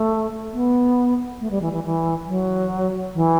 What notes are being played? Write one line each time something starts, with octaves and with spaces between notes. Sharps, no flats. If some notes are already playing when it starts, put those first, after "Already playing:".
Already playing: A3
B3
A3
G3
E3
E3
E3
F#3
E3